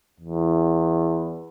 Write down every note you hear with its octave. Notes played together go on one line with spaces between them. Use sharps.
E2